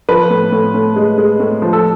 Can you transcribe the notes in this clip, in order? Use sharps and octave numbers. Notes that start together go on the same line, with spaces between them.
F3 B4
A2
A2
A2
G#3
G#3
A2
F3
A4